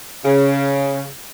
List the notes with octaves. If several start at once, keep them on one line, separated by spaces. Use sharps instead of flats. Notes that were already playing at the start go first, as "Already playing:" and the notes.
C#3